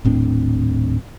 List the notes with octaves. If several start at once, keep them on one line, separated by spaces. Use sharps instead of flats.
D#1 A2 C4 D4